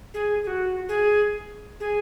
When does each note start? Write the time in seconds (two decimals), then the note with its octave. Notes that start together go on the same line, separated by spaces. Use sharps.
0.14 G#4
0.44 G#4
0.47 F#4
0.89 G#4
1.80 G#4